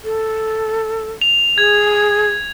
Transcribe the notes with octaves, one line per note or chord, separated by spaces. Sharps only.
A4
F7
G#4 G#6